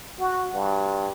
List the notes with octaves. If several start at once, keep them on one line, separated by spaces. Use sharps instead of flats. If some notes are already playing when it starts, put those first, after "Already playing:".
F#4
G2